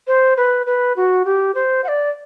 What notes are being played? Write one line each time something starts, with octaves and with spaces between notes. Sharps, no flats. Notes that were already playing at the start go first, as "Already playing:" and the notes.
C5
B4
B4
F#4
G4
C5
F#5
D5